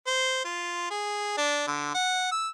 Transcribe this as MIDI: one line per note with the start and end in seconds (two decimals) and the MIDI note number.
0.07 0.41 72
0.45 0.86 65
0.90 1.33 68
1.37 1.66 62
1.67 1.94 50
1.94 2.28 78
2.32 2.49 88